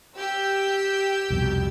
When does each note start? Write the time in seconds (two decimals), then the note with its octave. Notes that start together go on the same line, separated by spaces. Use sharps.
0.17 G4 E6 G6
1.30 C2 F2 B2